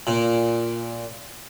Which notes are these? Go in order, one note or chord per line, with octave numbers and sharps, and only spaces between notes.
A#2